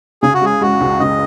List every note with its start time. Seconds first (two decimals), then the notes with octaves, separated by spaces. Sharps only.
0.23 C#3 G#4
0.34 F#4
0.42 G#3 G#4
0.61 G#3 F#4
0.81 C#2
1.00 C#2 D#5